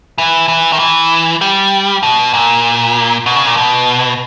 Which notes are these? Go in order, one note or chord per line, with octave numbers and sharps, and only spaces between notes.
E3
E3
D#3
E3
G3
B2
A#2
B2
C#3
A#2
B2